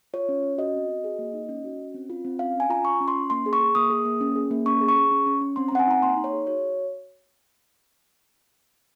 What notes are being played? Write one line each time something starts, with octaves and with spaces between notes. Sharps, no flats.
F4 C#5
C#4
C#4
F#4 D#5
C4
F#4
G#4
A#3
D#4
C#4
F#4
C#4
C4
F4
C4
C#4 F5
C#4
G#5
F4 A#5
F4 C#6
C#4
C6
C#4
A#3 C6
G#4
C#6
G#4
A#3 D#6
G#4
A#3
C#4
G#4
A#3
C#4 C#6
G#4
C#6
G#4
C#4
C#4
C#4
C4 C6
A#5
C4 F#5
G#5
D#4 A#5
A#3 C6
D#4
C#5
G#4
F#4 C#5